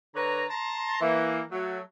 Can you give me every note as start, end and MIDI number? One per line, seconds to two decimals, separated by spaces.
0.15 0.45 50
0.15 0.45 71
0.15 0.45 73
0.15 0.45 82
0.49 0.97 81
0.49 0.97 82
0.49 0.97 84
1.01 1.40 52
1.01 1.40 58
1.51 1.79 54
1.51 1.79 57